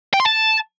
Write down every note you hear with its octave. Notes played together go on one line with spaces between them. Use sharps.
G5
C6
A5